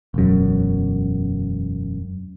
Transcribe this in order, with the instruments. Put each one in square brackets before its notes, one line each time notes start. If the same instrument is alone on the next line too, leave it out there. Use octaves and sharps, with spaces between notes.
[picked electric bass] E1 F#2